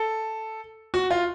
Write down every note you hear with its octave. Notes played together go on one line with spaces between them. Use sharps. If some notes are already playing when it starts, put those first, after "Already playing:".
Already playing: A4
F#4
F4